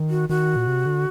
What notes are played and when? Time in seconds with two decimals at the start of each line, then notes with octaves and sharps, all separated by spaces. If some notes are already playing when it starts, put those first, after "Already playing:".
Already playing: D#3
0.10 F#4
0.29 D#3 F#4
0.56 A#2
0.67 C3
0.86 D3